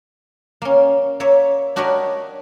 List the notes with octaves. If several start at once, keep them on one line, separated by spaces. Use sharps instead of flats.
A#3 C#4
A#3 C#5 E5
D4 F#4 G4 A#4 C#5 D#5